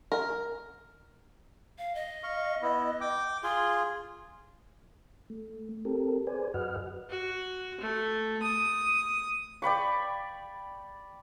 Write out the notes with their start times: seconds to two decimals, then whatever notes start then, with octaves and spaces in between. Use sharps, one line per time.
0.12 A#4
1.78 F5
1.95 D#5
2.23 F5 C#6
2.62 B3 E4
3.01 G5 D6
3.43 F4 G#4 C6
5.30 A3
5.85 C4 G4 A4 A#4
6.27 G#4 B4 C5 D5 G#5
6.54 F#2 F#4 B4 D#5 F#5 F6
7.10 F#4
7.81 A3
8.42 D#6
9.62 D5 G5 B5 C#6